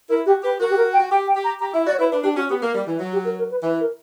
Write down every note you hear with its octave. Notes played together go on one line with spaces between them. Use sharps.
E4 A#4
F#4 G4
G4 B4
F#4 A#4
G4
A#4
G5
F#4
G4 G5
G5
G4
A#5
G4 A#5
E4 E5
F#4 D5
C#5
E4 B4
D4 B4
D4 G4
C#4 F#4
B3 G4
A#3 A#4
G3
E3
F#3
G4
A#4
A#4
B4
E3 B4
A#4